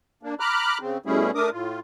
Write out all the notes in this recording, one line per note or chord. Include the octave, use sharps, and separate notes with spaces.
A#3 D4
A#5 B5 D6 F6 F#6
C#3 C4
B2 G3 A3 C#4 E4 G#4
A3 D4 A#4 D6 D#6
A2 F4